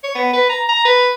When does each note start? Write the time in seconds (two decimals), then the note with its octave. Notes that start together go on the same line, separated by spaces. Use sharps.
0.04 C#5
0.15 B3
0.33 B4
0.49 A#5
0.69 A#5
0.85 B4